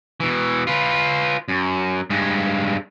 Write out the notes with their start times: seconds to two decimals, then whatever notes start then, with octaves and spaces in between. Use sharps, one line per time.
0.20 B2 E3
0.67 F4 B4
1.48 F#2
2.10 G2 G#3